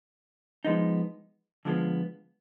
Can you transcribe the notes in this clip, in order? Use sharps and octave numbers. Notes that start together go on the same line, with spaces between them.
F3 G#3 B3 D#4
D3 F3 G#3 B3 F4